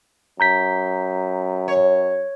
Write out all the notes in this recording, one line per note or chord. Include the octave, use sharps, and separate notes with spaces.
F#2 A#5 G6 B6
C#5